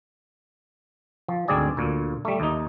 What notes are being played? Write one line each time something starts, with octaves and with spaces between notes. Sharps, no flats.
F3
D2 G#2 C4 G#4 D5 G#5
D2 A#2
G3 A3
D#2 D#4